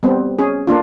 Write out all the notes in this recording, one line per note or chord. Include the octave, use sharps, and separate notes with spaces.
G3 B3 C4
C#4 G#4
A#3 D4 F4